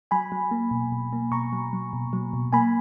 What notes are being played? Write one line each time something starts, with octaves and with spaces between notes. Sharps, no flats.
F#3 G#5 B5
F#3
A#3
B2
B2
A#3
B2 A#5 C#6
F#3
F#3
B2
F#3
B2
A#3 G#5 B5